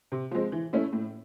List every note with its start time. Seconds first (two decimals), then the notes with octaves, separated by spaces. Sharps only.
0.12 C3
0.31 F3 G#3 C4
0.52 E3
0.73 A3 C#4 E4
0.93 A2